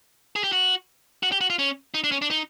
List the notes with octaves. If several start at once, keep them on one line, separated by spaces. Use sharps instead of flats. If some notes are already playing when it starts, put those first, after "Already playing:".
G#4
G4
F#4
F#4
G4
F#4
F4
C#4
D#4
D4
C#4
D4
D#4